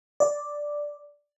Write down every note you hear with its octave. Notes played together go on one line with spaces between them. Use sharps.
D5